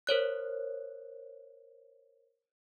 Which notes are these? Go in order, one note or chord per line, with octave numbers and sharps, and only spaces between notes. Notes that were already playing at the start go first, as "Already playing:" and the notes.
A#4 C5 C#5 F#6